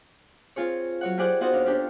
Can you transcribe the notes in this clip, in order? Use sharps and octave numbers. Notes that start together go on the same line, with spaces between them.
C4 F4 G#4 C#5
F#3 C#5 F#5
F4 G4 G#4 C5 D5 F#5
B3 D#4 F4 F#4 C5 F#5
D#2 D4 F5
C#4 D4 G4 A4